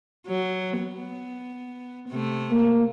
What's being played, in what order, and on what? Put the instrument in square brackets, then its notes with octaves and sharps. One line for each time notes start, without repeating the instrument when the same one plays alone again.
[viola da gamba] F#3
B3
C3 A3
[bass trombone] A#3